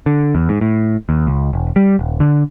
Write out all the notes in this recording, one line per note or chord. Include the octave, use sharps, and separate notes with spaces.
D3
E2
G#2
A2
D#2
C#2
E1
G3
D#1
D3